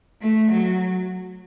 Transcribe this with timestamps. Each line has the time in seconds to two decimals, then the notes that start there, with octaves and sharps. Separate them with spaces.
0.22 A3
0.51 F#3